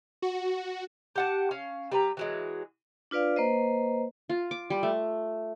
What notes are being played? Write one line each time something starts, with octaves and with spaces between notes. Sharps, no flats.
F#4
G4 F#5 A5
C#4 F5
G3 B4 A#5
E3 F#3 G#3
D4 F4 B4 D5 F5
A#3 B4 C5 D#5
F4
D6
G3
A3